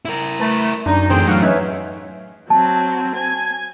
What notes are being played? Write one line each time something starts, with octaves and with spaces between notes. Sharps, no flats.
E4 A#4
A3 B4 A5
F#2 D4 D#4
E3 A3 C4 G#4 C5 G5
F#3 D#4 F5 F#5 C#6
C#4 D#4 B4 C#5 E5
F#3 C4 A5
G#5